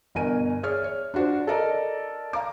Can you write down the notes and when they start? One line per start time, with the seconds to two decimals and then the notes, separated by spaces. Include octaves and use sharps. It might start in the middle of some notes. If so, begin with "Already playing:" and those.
0.15 G1 B2 A#4 G#5 D#7
0.63 G#4 C#5 D5 E5 F6
0.84 C#5
1.14 D4 F4 F#4 C5 D5
1.47 A4 A#4 D5 D#5 A#5
2.33 F5 A#5 D6